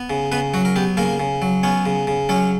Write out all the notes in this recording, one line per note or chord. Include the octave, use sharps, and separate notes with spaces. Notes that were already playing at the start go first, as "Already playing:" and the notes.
Already playing: B3
C#3
C#3 B3 B4
F#3 F#4
A#4
B3 G4
C#3 A#3 A#4
C#3
F#3
B3 C#4 C#5
C#3
C#3
F#3 C#4 C#5